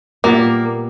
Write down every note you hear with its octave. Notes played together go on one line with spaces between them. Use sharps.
A#2 G3 A#3 B3 E4